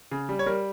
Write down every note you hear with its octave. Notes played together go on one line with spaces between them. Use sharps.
C#3
G3
C#5
G3 A#4